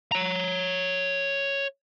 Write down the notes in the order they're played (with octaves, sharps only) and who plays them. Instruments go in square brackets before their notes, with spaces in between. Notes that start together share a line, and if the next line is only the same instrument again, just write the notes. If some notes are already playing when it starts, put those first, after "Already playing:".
[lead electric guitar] C#5 A#5